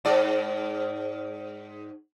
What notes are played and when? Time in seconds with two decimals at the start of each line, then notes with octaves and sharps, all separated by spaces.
0.05 G#2 D5